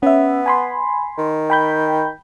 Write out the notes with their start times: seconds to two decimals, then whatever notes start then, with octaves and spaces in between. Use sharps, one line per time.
0.03 B3 C#4 E5
0.46 G#5 B5 C6
1.18 D#3
1.50 G5 B5 G6